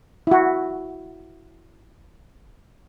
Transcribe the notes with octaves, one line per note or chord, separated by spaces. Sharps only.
E4 F#4